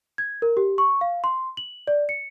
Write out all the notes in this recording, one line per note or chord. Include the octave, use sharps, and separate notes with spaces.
G#6
A#4
G4
C#6
F5
C6
F#7
D5
C#7